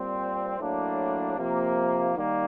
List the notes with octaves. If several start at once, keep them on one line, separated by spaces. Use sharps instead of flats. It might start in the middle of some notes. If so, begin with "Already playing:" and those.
Already playing: A#2 G3 C4
A2 F#3 A#3 D4
C3 F3 A#3
D#3 G3 A#3